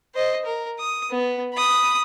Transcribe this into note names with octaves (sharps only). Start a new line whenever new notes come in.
C5 D#5
A#4
D#6
B3
B5 D#6